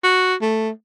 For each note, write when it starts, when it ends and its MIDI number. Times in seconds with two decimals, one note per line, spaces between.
0.04 0.35 66
0.41 0.70 57